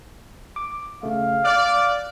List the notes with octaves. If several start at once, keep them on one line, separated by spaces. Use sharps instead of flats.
D6
C#3 A3 F5
D5 F6 F#6